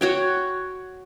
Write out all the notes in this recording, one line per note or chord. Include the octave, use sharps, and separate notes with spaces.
F#4 C#5 G5